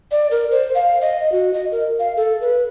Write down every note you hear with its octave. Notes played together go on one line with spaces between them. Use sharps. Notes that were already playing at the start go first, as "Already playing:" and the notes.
D5
A#4
C5
F5
D#5
F#4
D#5
A#4
F5
A4
B4